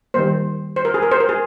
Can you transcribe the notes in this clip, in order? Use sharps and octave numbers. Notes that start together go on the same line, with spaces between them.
D#3 G3 A#3 C5
C5
A#4
G#4
A#4
C5
A#4
G#4